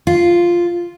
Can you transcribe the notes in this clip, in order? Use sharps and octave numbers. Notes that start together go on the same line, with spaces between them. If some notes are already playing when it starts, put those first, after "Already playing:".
F4